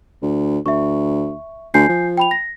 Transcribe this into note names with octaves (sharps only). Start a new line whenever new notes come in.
D2
D2 E5 C#6
D2 G#5 G6 C7
F3
G5 B5 F7
A#6